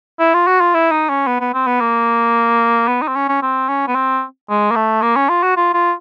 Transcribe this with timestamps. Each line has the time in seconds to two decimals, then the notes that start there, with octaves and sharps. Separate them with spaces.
0.20 E4
0.34 F4
0.47 F#4
0.60 F4
0.74 E4
0.92 D#4
1.09 C#4
1.27 B3
1.40 B3
1.54 C4
1.67 B3
1.80 A#3
2.88 B3
3.02 D#4
3.08 C4
3.15 C#4
3.29 C#4
3.42 C4
3.68 C#4
3.88 B3
3.95 C4
4.50 G#3
4.71 A#3
4.76 A3
5.02 A#3
5.16 C#4
5.29 F4
5.43 F#4
5.57 F4
5.74 F4